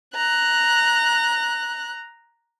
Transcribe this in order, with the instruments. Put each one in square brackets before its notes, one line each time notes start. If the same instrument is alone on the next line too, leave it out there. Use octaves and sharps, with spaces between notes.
[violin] A#5 F#6